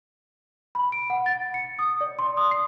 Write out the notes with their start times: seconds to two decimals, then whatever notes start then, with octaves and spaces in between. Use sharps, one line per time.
0.75 B5
0.92 D7
1.10 F#5
1.26 A6
1.54 C#7
1.79 D#6
2.01 D5
2.19 C6
2.37 D#6
2.51 C7